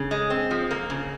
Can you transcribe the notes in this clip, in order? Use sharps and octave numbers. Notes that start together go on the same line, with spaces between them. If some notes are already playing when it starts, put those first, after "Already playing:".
Already playing: C#3
G#3
C4
F3
A#3
C#3